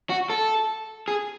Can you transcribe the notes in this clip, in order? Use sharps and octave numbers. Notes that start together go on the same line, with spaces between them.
F#4
A4
G#4